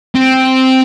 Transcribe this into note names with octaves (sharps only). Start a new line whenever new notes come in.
C4